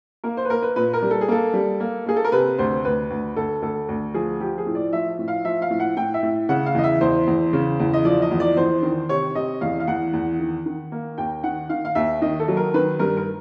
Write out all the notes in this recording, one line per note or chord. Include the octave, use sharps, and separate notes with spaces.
A#3 A#4
C5
B4
A#3 A#4
B4
A#2 B4
A#4
G3
A4
G#4
A#3 A4
G3
A#3
A#3 G#4
A4
A#4
C3 B4
D2 C5
D2 B4
D2
D2 A4
D2 A4
D2
F3 G#4
F3 G4
G#4
A2
D5
F3 E5
A2
F5
F3 E5
F5
A2
F#5
A2 G5
E5
A2
C#3 F#5
F5
E2 D#5
E5
E2 C5
E2
C#3
E2
D#5
F3 D5
D#5
E2
D5
E2 C5
D#3
C3 C#5
C3 D#5
E2 F5
F5
E2 F#5
E2
D#3
D#3
A#3
D#2 G5
D#3 F#5
D#3 F5
F5
D#2 E5
D#3 D#5
A4
F#3
A#4
D#3 B4
G2 A#4
A#4